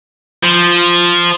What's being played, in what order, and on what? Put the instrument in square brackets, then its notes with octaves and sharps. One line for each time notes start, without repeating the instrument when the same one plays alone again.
[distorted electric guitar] F3